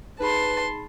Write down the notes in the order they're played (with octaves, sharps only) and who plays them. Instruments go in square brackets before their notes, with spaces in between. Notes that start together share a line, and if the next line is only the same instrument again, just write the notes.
[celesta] D#4 G#4 B5 [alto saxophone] B4 [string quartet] A5 C6